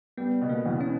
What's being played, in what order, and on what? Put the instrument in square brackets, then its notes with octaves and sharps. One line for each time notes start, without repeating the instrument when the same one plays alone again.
[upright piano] G3 [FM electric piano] B3
[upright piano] B2
[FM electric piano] A#3
[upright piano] E2
[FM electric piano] C#4